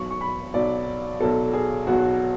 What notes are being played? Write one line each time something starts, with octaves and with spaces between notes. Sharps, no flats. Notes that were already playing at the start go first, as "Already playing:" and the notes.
Already playing: B1 B2 F#3 C#6
C#6
B5
B1 B2 F#3 D5
B1 B2 F#3 A4
G#4
B1 B2 F#3 F#4